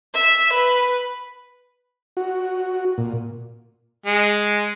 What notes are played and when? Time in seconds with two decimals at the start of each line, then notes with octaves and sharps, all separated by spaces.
0.14 E5
0.53 B4
2.17 F#4
2.98 A#2
4.06 G#3